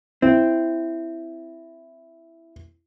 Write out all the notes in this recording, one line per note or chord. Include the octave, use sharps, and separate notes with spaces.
C4 E4